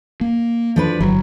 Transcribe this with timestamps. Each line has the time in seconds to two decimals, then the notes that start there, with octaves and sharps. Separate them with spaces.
0.21 A#3
0.76 F3 D4 B4
1.00 G1 F#3